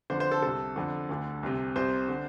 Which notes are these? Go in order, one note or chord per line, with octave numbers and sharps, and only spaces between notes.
F2 D3 C5
C5
A4
C2 C3 A4
F2 D3
D2 D3
C2 C3
C2 C3 C5
D3